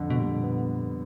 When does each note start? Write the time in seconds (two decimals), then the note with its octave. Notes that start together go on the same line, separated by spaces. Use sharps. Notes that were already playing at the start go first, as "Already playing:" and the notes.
Already playing: F2 D3
0.10 B2
0.19 A#2 G3
0.43 B3